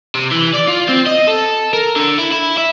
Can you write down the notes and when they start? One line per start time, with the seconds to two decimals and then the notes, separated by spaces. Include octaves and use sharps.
0.15 C3
0.31 E3
0.54 D5
0.67 F4
0.89 C4
1.07 D#5
1.28 A4
1.73 A#4
1.96 D3
2.18 E4
2.31 E4
2.58 E5